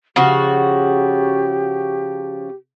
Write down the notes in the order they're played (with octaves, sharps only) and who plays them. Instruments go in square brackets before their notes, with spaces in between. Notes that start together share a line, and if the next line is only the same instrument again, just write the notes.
[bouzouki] C#3 F3 F#4 [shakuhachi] G4